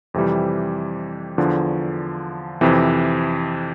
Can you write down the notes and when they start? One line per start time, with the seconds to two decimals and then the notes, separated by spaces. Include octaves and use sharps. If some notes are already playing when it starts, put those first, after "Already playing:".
0.14 F2 C3 E3 G3
1.38 E2 D3 F3
2.61 F2 C3 E3